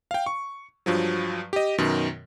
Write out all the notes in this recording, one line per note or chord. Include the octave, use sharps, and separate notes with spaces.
F5 G5
C#6
G2 F3 F#3
G4 D#5
F#2 B2 D#3